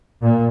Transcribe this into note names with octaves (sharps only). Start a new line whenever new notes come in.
A#2